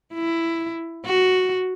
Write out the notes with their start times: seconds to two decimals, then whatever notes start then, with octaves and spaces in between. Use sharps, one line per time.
0.14 E4
1.06 F#4